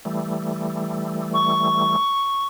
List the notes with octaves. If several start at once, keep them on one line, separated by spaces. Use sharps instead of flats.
E3 G3 A3
C#6